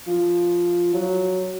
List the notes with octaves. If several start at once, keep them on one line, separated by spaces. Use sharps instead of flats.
F3
F#3